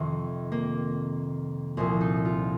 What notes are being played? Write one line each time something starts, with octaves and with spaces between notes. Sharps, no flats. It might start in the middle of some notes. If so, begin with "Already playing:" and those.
Already playing: F2 C3 D#3
A#3
C2 A#2 F3 C4
D#4
F4